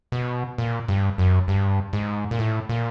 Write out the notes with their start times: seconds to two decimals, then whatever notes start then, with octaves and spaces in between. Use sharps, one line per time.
0.12 B2
0.58 A#2
0.88 G2
1.18 F#2
1.48 G2
1.93 G#2
2.31 A#2
2.39 A2
2.69 A#2